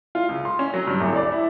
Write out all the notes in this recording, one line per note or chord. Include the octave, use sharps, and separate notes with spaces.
F4
C#2
C6
C#4
F#3
G2
D1
D5
E4